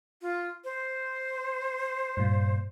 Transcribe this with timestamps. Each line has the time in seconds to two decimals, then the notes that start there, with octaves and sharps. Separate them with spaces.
0.22 F4
0.64 C5
2.17 G2 A#2